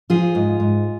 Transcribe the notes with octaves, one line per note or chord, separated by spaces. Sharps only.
F3 F4 G#4
G#2
G#2